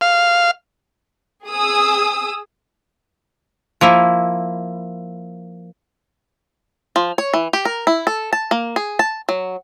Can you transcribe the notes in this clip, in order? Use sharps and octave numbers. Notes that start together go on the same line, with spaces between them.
F5
G#4 D#6 E6
F3 A#3 E4
F3
C#5
E3
G4
A#4
E4
A4
A5
A#3
G#4
A5
F#3